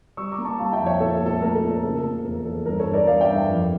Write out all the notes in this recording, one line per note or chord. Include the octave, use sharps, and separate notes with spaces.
G3 C#6 E6
A#5 D6
A#3
A5 C#6
G3 F5 A5
E5 G5
F2
C#5 E5
A#2 A4
A#2
A4
A3 A#4
A4
A#2
A#4
C#3 A4
A#3
E2 A#4
E2 A4
G2 A#4
A4 C#5
G2
A#4 D5
G2 D5 F5
E5 G5
G2
F2